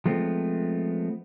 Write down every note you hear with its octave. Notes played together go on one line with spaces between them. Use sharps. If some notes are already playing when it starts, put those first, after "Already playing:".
F3 G#3 A3 B3 C4